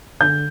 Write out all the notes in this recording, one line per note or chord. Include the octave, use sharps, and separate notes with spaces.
D3 G6